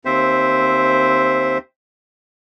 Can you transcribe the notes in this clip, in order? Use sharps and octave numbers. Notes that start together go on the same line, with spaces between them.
D#2 C4 C5 E5